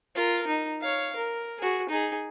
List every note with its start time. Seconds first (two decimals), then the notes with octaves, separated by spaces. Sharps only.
0.15 F4 A#4
0.47 D#4
0.81 C#5 F5
1.16 A#4
1.60 F#4 G#4
1.90 D#4 G#4